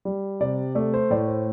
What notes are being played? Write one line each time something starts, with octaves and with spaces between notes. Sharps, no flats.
G3
C3 D5
A3 D5
C5
A2 D5
C5